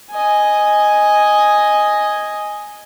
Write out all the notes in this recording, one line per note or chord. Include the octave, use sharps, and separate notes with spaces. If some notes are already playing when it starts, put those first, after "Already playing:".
D#5 G#5